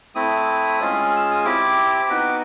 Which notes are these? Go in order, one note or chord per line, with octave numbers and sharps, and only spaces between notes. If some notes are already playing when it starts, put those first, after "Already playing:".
A3 C4 E4 D#6
G#3 C#4 F4 G#4
E6
D#6
C4 E4 G4 D6
B3 D#4 F#4